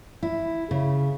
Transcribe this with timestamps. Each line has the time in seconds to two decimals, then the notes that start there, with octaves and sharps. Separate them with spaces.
0.23 E4
0.71 C#3